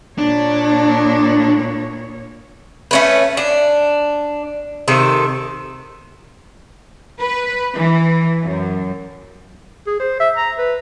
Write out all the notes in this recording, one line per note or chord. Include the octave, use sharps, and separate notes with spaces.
A#2 D4 C#5
A3 C#4 B4
D4
C3 D#3 A4
B4
E3
F#2
G#4
C5
E5
A#5
B4